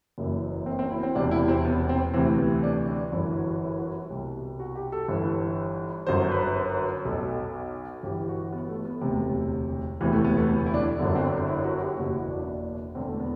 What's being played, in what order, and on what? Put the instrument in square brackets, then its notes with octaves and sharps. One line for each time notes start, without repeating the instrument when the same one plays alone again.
[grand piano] F#1 F#2 E3
C4
C4
E4
C4
E1 E2 C3 E3 D4
E4
C4
B3
C4
D2 C3 E3 C4
B3
D4
D4
G1 F#2 E3 E4
F#4
E4
F#4
C2 B2
F#4
G4
A4
G1 G2 E3
G1 F#2 D3 C5
B4
B4
B1 B2 A4
G1 G2 E3 G4
F#4
B3
A3
B3
E1 D2 C3
E1 D2 C3 E3 B3
A3
B3
A3
B3
E4
D4
G1 F#2 D3 B3
C4
D4
E4
F#4
G4
F#1 E2 B2 F#4
E4
D4
E1 E2 D3 C4
A3
B3